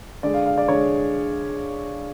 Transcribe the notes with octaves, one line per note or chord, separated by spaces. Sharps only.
D3 G#3 D5
F5
F5
D5
D3 G#3 C#5